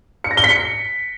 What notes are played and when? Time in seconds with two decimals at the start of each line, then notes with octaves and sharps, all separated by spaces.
0.24 C#7
0.31 A#6
0.37 G7
0.44 B6
0.50 C#7